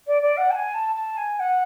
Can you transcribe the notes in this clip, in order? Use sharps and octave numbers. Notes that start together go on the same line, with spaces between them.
D5
D5
F#5
A5
G#5
A5
A5
G#5
F#5